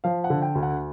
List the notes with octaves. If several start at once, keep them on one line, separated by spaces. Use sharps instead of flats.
F3 F5
F#5
D3
G5
D2
F#5